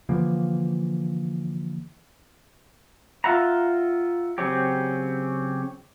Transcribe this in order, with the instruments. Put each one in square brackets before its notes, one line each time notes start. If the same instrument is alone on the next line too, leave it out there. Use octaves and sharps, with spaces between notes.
[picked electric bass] D3 E3 F3 A#3
[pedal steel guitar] F4 E5 F#5 A#5
C#3 F#3 C4 C#4 G4